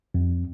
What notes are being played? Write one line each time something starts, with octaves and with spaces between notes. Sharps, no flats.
F2